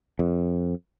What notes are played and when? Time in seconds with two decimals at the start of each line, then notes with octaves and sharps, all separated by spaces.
0.19 F2